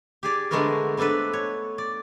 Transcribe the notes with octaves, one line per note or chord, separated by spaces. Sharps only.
G4 G#4 D5
D3 G#3 A3 B3 F#4 A#4
B3 C4 D4 A4 B4
C#5
D5